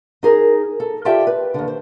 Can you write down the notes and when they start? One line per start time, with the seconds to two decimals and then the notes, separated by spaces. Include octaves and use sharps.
0.23 D#4 G#4 A#4
0.80 A4
1.05 F4 G4 A4 D5 E5 G5
1.27 B4
1.54 D#2 D3
1.68 C5